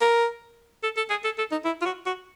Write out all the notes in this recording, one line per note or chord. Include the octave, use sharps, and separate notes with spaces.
A#4
A4
A4
G#4
A4
A4
D#4
E4
F4
F#4
F#4